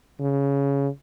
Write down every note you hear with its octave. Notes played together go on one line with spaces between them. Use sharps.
C#3